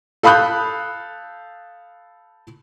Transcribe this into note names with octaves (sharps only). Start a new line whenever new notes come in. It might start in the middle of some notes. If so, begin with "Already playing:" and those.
A4 F5 B5 D#6 F#6 G6